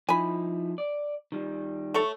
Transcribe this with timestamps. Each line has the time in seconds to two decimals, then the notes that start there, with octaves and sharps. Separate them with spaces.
0.09 F3 D#4 E4 G#5 B5
0.78 D5
1.32 D#3 G3
1.94 A3 A4 C#5